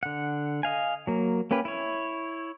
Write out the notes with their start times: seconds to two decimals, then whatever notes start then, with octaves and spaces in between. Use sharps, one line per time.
0.03 D3 F#5
0.63 D#5 F5 G#5
1.07 F#3 A#3
1.51 A#3 C#4 G4 B4
1.65 E4 C#5